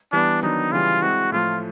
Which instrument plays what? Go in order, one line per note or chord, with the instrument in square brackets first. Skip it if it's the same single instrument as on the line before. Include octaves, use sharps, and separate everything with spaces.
[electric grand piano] E3 G3 B3 [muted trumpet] D4
[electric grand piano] D#3 F#3 B3 D4 [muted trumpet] D#4
[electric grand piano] C#3 E3 G3 [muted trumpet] F4
[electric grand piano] G#3 C4 E4 [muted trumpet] F#4
[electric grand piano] A2 F3 A3 [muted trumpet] F4